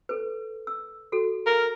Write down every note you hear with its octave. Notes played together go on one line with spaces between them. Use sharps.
A4 B4
E6
F#4 A4
A#4